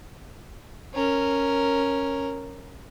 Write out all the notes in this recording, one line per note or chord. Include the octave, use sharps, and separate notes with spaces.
C#4 A#4